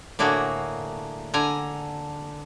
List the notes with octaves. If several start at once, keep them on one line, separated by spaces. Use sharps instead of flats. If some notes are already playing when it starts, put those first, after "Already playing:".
A2 D3 A#3 F#4 G#4
D3 G#5 A#5